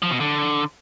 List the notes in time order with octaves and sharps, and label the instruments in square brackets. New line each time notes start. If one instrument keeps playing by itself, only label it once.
[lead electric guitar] F3
B2
D3